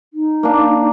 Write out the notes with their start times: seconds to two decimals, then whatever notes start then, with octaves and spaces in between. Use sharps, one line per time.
0.14 D#4
0.43 A#3 D4